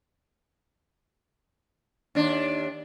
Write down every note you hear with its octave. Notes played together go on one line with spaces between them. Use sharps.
D#2 D4